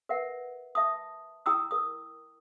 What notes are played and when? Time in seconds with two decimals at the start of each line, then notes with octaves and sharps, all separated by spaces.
0.09 A#4 B4 E5 F#5
0.75 E5 A5 D#6
1.46 E4 G5 A#5 D#6 E6
1.71 A#4 D#6